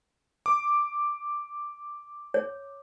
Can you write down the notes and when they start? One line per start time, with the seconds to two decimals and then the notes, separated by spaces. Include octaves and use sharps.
0.46 D6
2.34 C#5